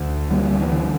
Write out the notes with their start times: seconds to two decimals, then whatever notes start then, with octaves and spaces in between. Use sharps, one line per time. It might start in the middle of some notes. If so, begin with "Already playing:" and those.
Already playing: D2
0.31 D3 G3 A#3
0.59 E3
0.72 D3